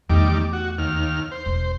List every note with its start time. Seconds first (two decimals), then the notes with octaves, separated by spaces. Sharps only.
0.10 E2 D#3 G3 A3 D6
0.53 F#4
0.78 D#2 F6
1.31 C5
1.46 E1